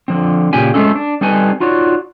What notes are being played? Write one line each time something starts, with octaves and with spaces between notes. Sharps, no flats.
D3 F3 C4
A#2 C#3 G4 G#5
G#3 A3 C4 C#4 A4
D4
G3 C4 D#4 A4 B4 G#5
D#4 F4 F#4 C#5 D5